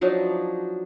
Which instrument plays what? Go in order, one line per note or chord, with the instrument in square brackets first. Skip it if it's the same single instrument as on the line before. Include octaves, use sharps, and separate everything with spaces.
[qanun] F3 F#3 D4 D#4